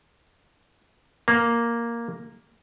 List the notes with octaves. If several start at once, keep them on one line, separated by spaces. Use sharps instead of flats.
A#3